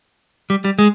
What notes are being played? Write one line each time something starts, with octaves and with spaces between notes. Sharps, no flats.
G3
G3
G#3